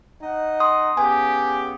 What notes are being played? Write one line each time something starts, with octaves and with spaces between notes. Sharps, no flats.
D#4 D#5 F#5
C6 D#6
C#3 B3 G4 G#5